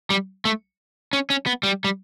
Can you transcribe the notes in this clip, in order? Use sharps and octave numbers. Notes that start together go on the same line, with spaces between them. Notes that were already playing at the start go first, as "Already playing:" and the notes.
G3
A3
C#4
C#4
B3
G3
G3